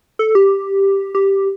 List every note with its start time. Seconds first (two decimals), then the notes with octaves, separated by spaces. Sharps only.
0.19 A4
0.35 G4
1.15 G4